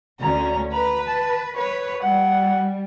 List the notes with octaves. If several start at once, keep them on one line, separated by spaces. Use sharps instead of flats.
D2 C#4 A#5
B4 A#5 B5
A5
B4 C#5
G3 F#5